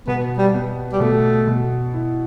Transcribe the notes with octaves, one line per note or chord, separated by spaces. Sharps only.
B2 B3
G3
B3
G3
B2 A3
B2
E4